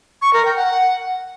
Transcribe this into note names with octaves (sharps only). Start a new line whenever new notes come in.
C#6
A#4
G5
F#5